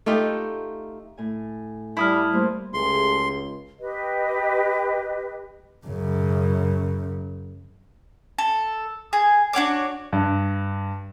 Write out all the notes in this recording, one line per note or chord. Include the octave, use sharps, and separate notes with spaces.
A3 D#4 F4 G4
A2 G#5
G3 E4 F5 A5 D#6 F6
G3 A3 A#3 C5
C#2 A3 G4 G#4 C6
G4 B4 D#5
F#2 C#3
A4
G#4
D4 F#4 C#5 D6
G2